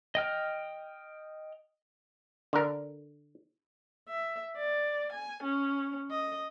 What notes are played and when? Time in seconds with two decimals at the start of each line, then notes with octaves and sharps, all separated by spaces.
0.15 D#5 G5 F6
2.53 D3 A#4
4.08 E5
4.57 D5
5.13 G#5
5.43 C#4
6.11 D#5